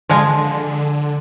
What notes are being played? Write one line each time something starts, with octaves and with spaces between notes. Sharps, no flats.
D3 F3 G#3